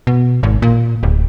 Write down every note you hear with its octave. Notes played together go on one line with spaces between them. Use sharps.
B2
G#1
A#2
D1